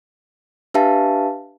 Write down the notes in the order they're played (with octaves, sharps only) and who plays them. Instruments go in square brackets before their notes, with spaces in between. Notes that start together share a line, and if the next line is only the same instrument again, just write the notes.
[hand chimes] D4 G4 B4 E5 F5 A5